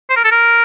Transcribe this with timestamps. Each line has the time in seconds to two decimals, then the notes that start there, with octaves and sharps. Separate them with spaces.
0.10 C5
0.16 A#4
0.25 A4
0.32 A#4